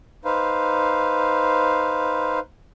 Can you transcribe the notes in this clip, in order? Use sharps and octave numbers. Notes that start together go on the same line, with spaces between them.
D#4 B4 C5 F5